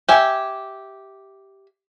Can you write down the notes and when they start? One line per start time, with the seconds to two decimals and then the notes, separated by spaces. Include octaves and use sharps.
0.09 G4 E5 G#5